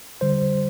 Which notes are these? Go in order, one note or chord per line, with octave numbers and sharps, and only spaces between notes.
D3 G3 C5